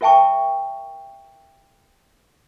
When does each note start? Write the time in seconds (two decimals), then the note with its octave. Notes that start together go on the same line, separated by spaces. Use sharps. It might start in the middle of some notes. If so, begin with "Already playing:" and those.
0.01 F4 A#4 E5 G5 A5 C#6